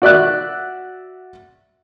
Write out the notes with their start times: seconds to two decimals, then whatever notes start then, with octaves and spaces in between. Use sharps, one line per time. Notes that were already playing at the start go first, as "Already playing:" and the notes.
0.02 F#4 D5 E5 F#6